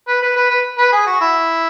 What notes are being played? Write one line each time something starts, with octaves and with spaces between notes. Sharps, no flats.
B4
B4
B4
B4
B4
G#4
F#4
E4